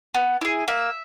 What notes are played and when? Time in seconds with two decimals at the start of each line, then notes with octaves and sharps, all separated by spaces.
0.14 B3
0.41 E4 G#4
0.68 A#3 E5